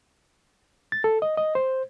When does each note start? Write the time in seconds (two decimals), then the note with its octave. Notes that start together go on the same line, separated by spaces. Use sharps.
0.92 A6
1.04 A4
1.22 D#5
1.37 D#5
1.55 C5